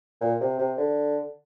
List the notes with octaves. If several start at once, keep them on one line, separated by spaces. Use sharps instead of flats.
A#2
C3
C3
D3